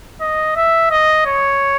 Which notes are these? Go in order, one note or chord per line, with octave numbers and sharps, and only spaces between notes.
D#5
E5
D#5
C#5